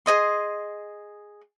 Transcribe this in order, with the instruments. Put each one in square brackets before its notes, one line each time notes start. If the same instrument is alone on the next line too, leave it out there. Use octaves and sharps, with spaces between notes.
[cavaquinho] G#4 C#5 D#5 C6